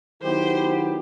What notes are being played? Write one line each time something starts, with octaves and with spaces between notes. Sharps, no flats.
D#3 F#3 B3 E4 G4 C5